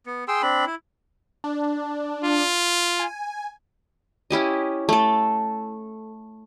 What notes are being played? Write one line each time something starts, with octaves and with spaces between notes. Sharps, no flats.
B3
G#4 G5 C6 E6
C4 D4 B5
E4
D4
F4
G#5
C#4 E4 G4 D#5
A3 A4